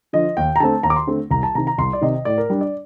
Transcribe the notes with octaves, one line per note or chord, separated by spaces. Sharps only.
D3 F3 D#5
D#2 G5
A#5
D3 A3 C4 A5
D#2 A#5
D6
C6
D3 A3 C4
C2 A#5
A5
C3 D#3 A#5
A#5
C2 C6
D5
C3 D#3 D#5
A2 D5
A#4
G3 D4
D5